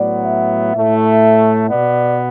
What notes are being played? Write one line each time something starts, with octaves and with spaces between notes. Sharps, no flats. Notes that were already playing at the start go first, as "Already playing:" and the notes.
Already playing: A2 F#3 B3 D5
E5
A2 A3
B2 B3 D5